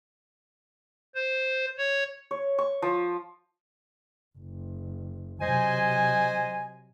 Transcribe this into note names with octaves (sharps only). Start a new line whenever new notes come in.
C5
C#5
C#5
C#6
F3
F#1
C3 F#3 C5 D#5 G#5